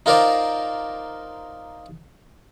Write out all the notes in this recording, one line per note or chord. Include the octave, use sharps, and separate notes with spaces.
D#4 F4 A#4 C5 D5 F5